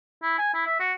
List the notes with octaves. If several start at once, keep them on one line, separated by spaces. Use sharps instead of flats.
E4
G#5
E4
E5
F#4